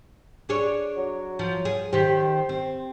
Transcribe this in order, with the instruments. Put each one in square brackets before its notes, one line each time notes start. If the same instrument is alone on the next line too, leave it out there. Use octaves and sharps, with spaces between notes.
[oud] D4 G#4 C#5
[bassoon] F#3
[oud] F3
G#4
[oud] D#3 G4 [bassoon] C5
[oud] C4